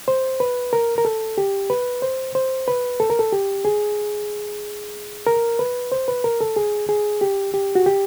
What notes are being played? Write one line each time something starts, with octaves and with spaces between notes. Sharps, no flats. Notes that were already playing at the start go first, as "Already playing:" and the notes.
C5
B4
A#4
A#4
A4
G4
B4
C5
C5
B4
A4
A#4
A4
G4
G#4
A#4
B4
C5
B4
A#4
A4
G#4
G#4
G4
G4
F#4
G4